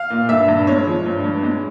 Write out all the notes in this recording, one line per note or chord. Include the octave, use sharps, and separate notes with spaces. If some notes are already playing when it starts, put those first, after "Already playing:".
Already playing: F5
A#2
G2 E5
G2
G#3 C#5
F3
G2
G2
G#3